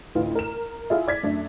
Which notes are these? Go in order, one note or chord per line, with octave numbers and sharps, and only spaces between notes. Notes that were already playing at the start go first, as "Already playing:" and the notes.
A1 D2 F4 B4
A#4 E7
E4 F4 G#4
D5 G#6 B6
F#2 A3 D4